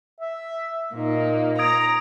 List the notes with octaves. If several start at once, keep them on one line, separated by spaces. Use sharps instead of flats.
E5
A#2 A#3 D#4
A#5 D#6 G#6 D7